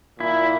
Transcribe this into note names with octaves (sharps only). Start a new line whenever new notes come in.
A#2 E4